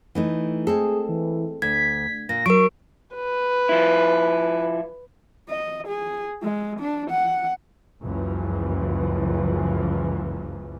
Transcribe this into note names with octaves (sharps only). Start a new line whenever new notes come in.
E3 A3 D#4
G#3 C4 G#4 A4
E3
D2 G#6 B6
A#2 A#6
F#3 A#4 C#6 D7
B4
F3 E4
D#5
G#4
G#3
D4
F#5
F#1 C#2 F#2 E3 F3